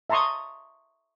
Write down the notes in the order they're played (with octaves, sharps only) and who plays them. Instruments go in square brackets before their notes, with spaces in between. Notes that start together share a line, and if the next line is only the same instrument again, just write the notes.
[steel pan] E5 A5 A#5 C6 C#6 D#6